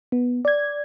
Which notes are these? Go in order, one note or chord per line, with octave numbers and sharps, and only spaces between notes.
B3
D5 G#6